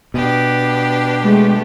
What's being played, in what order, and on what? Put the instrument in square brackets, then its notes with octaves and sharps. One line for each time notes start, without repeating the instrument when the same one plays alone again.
[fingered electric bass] B2 [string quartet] D4 G4 B4
[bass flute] G#3 [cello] A3